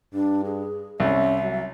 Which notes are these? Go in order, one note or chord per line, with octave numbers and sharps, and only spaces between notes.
G2 D4
G#4
C2 C#4 E5
F#3